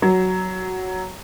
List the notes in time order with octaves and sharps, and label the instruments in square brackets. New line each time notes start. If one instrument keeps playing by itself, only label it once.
[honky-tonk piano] F#3